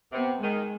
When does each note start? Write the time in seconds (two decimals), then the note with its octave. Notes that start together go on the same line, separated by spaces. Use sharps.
0.12 C3 B3
0.42 D#3 G#3